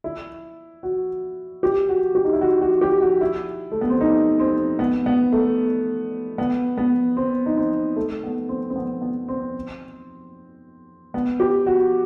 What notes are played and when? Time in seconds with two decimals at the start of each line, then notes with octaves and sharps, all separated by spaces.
0.04 E4
0.83 F#4
1.63 G4
1.89 F#4
2.15 G4
2.24 D#4
2.33 E4
2.41 F#4
2.61 F#4
2.81 G4
3.02 F#4
3.21 E4
3.72 A3
3.81 B3
3.90 C4
4.01 D#4
4.40 C4
4.79 B3
5.06 B3
5.32 A3
6.38 B3
6.77 B3
7.17 C4
7.46 D#4
7.57 C4
7.96 A3
8.24 B3
8.49 C4
8.70 C4
8.76 B3
9.02 B3
9.28 C4
11.14 B3
11.40 G4
11.67 F#4